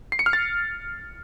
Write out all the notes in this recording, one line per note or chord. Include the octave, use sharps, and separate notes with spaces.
C7
C#7
F6
A6